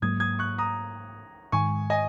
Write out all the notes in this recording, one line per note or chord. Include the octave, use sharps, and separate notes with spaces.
G#2 F#3 A#3 D#6 G#6
D#6 G#6
C#6 F#6
A#5 D#6
G#2 D#3 G#3 G#5 C#6
D#5 G#5